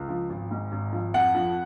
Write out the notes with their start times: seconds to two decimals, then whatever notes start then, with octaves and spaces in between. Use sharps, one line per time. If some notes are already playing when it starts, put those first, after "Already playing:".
Already playing: C#2
0.08 F3
0.30 G#1
0.51 G#2
0.72 G#1
0.92 F3
1.14 F2 F#5
1.35 F3